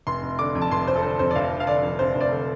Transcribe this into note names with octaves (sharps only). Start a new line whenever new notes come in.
F1 C6
F1
D3 D6
F2
A5
F1 C6
F1 C5
A4
D3 C5
F2 C5
D5
F1 F5
F1
F5
D3 D5
F2
F1 C5
F1
D5
D3